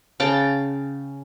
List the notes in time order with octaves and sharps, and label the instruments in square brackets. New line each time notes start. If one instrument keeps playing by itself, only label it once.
[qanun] C#3 G5 A5